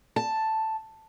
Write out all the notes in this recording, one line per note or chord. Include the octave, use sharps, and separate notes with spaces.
A5